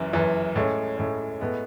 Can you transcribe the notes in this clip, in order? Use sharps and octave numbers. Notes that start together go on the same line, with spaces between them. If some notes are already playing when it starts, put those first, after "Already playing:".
Already playing: F#1 F#2 E3
F#1 F#2 E3
A2 G#3 C#4
A2 G#3 C#4
A2 G#3 B3